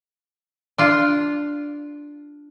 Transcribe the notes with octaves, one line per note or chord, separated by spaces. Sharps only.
D4 F4